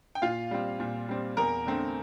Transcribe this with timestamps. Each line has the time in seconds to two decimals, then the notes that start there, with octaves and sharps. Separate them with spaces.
0.15 G5
0.22 A#2 F4 F5
0.51 G3 C4
0.80 A#2
1.09 G3 C4
1.37 E2 A#4 A#5
1.66 D3 A3 C4